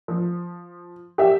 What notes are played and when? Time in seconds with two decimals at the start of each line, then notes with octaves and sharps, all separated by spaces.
0.08 F3
1.18 G4 E5